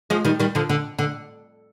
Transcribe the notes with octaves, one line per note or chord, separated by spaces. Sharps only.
F3 G#3
D#3 G3
D#3 G3
D3 F3
D3
D3